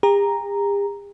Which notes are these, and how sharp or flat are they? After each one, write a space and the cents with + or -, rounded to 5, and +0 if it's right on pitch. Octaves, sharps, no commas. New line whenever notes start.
G4 +45 A#5 +0